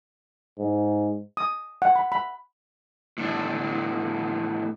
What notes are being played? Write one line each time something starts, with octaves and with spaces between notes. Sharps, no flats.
G#2
D#6
F#5
B5
B5
A2 B3 D4